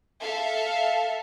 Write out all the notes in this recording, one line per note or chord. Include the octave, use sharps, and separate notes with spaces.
A4 E5 F5 A5